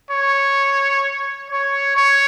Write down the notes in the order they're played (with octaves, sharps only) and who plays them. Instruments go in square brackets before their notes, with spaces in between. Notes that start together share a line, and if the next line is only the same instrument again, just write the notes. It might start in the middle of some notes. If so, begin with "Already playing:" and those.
[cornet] C#5
C#5
C#5